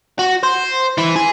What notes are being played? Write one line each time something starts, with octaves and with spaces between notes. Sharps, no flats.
F#4
C5
E3
G#4